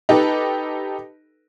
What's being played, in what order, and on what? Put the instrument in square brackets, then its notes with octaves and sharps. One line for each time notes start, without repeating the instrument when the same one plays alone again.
[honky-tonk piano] D#4 G4 A4 B4